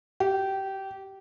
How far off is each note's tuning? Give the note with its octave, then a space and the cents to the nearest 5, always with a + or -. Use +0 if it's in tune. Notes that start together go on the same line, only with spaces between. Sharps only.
G4 -20